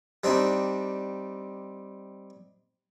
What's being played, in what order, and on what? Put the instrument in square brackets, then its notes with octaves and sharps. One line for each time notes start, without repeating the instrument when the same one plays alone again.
[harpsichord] G3 C4 D4 D#4